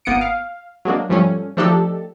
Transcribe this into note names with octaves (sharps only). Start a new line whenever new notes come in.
G#1 A#3 B3 D#6 C#7 D7
F5
F#3 G#3 A#3 D4
G#2 F3 G3 A3 C#4
F3 A3 D4 D#4 G4 A4